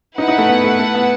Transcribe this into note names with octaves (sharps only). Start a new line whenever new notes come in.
D#4 E4 B4 F#5
D#4
A3
B3
A3
A3
B3